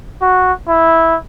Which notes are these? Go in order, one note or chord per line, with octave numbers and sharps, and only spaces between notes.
F#4
E4